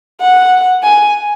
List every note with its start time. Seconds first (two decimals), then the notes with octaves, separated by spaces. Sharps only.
0.21 F#5
0.83 G#5